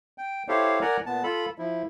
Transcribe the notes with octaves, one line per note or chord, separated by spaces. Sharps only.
G5
E4 G4 A4 C5 C#5 F5
A#4 D5 F#5 G#5 A#5
A#2 B3 A5
F4 A4 B5
F3 E4